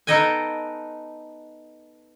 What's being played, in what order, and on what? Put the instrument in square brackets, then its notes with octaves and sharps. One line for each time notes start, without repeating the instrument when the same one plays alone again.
[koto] B3 D#4 A4 D#5 G5 G#5